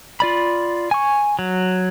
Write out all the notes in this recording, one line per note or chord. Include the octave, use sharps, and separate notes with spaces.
F4 D5 B5
G#5 C#6
F#3